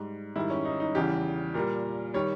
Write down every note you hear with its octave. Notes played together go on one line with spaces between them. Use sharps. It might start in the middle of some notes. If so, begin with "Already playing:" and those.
Already playing: G#2 G3
G#2 D#3 G3 E4
C#4
D#4
D#4
E2 C#3 E3 G3 G4
A#2 G3 A#4
D#3 G3 C#5